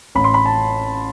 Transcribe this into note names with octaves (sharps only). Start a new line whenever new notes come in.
A1 B5
C6
B5
A5